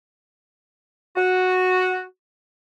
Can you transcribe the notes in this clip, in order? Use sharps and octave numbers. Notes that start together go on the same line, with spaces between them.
F#4